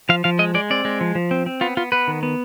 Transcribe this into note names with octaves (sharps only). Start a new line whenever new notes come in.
F3 F5
F3 F5
G#3 D#5
G#3 D5
C4 D5
G#3
F3
F3
C4
C4
B3 F4
B3 F4
B3 B4
D#3
B3